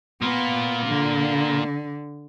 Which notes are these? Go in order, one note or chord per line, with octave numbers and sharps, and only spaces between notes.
A#3 B3 F4
D3